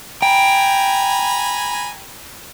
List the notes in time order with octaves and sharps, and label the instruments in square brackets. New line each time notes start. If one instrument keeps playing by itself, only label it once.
[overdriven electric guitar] G5 [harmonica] G#5 A#5 B5